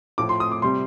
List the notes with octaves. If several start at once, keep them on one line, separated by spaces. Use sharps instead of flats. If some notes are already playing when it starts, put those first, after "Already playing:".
A2 F3 D6
C6
D#6
D6
C3 G3 C6